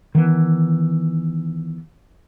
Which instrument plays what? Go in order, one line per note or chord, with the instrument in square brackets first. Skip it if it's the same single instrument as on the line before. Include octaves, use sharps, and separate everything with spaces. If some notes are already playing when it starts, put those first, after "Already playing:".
[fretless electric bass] D#3 E3 B3